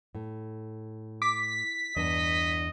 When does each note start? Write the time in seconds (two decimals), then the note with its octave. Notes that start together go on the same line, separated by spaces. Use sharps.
0.15 A2
1.22 D6 B6
1.97 E2 G2 D4 D#5